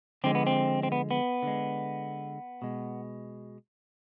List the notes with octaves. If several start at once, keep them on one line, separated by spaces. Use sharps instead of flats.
D3 F3 G#3 C4
B3
C4
C4
B3
B3
D3 G#3
B2 G#3